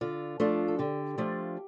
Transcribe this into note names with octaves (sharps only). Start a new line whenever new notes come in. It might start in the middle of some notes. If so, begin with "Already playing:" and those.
D3 F4
F3 A3 D4 F4
A4
D3 G4
F3 A3 D4 F4